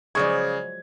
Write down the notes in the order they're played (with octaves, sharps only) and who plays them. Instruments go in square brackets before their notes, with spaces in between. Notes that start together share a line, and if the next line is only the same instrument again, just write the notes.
[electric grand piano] C#3 G#4 G#6 [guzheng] F3 F#3 G#3 [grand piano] D5 C#6